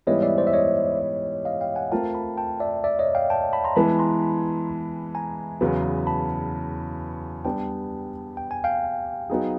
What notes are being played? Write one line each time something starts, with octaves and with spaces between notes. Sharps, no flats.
G#2 E3 G3 B3 E4 C#5 D#5
D5 E5
C5 D5
E5
C#5 D#5
D#5 F5
F5 G5
F#5 G#5
A3 C4 F4 A#4 G5 A5
A5 B5
G5 A5
D5 E5
D5 E5
C#5 D#5
F5 G5
G5 A5
A5 B5
A#5 C6
E3 G#3 B3 A5 B5
A#5 C6
A5 B5
G#5 A#5
E2 C#3 F#3 B3
A5 B5
G3 B3 D4 G4 G5 A5
G5
G#5
F5 G5
F#3 B3 D#4 G#4